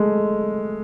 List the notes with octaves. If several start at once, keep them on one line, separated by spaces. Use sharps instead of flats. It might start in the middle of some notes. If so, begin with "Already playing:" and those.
Already playing: G#3 A3